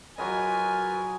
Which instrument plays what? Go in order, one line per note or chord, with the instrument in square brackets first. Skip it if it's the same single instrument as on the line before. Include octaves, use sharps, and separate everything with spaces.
[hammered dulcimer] F#3 G#4 D#5 [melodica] F4 A#4 B4 [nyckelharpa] G#5